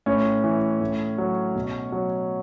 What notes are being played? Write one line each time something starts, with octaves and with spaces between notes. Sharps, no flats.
A2 C#4
E3
A2
F#3
B2
F#3